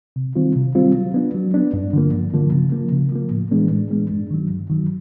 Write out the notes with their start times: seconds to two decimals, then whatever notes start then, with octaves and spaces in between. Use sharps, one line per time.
0.16 C3
0.35 D#3 G3 C4 F4
0.56 C3
0.75 D#3 G3 C4 F4
0.95 F#3
1.14 B3 D4
1.34 F#3
1.54 B3 D4
1.74 G2
1.93 D3 F3 A#3
2.13 G2
2.33 D3 F3 A#3
2.52 C#3
2.72 F3 A#3
2.92 C#3
3.12 F3 A#3
3.31 A2
3.51 E3 G#3 B3 D4
3.71 A2
3.90 E3 G#3 B3 D4
4.10 G2
4.31 D#3 F#3
4.50 G2
4.70 D#3 F#3